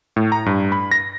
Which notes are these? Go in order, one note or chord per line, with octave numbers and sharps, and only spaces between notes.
A2
A#5
G2
B5
A#6